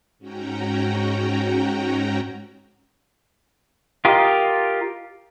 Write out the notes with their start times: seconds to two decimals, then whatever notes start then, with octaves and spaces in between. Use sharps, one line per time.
0.19 G#2 C#4 F#4 G5 A#5
4.05 F4 G4 A#4 D#5